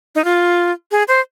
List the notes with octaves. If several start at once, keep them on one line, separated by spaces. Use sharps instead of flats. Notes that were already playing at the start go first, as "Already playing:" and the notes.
D#4
F4
G#4
C5